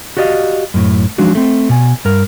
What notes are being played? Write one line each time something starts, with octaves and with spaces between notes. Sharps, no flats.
F#4 G4 D5 D#5 F5
F#2 A2
F3 F#3 G#3 D4 D#4 F#4
A3 C4
B2 G#5
G2 A#4